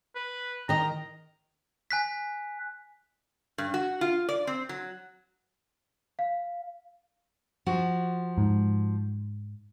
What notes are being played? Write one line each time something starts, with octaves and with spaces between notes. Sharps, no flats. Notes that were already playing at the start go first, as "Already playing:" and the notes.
B4
D#3 D#5 A#5
G#5 F#6 B6
G2
F#4
F4
D5
C4
F#3
F5
F3 F#4
G#2